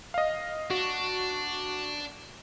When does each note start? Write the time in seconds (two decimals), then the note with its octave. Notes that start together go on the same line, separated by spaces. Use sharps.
0.14 D#5 F5
0.70 D4 F#4